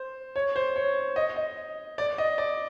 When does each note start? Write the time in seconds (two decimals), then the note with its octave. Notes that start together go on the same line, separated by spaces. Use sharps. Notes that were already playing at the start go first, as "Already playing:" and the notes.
Already playing: C5
0.36 C#5
0.56 C5
0.76 C#5
1.16 D#5
1.36 D#5
1.98 D5
2.18 D#5
2.38 D5